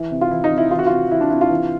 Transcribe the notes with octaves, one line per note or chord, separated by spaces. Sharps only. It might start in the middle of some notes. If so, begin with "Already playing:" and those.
Already playing: E3
C3
F4
E3 E4
D#4
C3
E4
E3 F4
F#4
C3 F4
E3 E4
D4
C3 E4
F4
E3